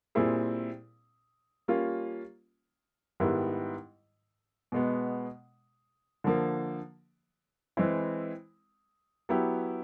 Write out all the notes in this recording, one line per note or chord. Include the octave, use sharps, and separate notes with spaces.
A#2 G3 C4 E4 G#4
G3 A#3 C#4 F4
G#2 D#3 G3 B3 E4
B2 G#3 B3
D3 F3 A#3
E3 G#3 C4 E4
F#3 B3 E4 G4